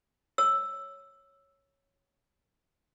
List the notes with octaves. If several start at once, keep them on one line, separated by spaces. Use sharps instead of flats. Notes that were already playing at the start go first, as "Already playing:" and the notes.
C#5 E6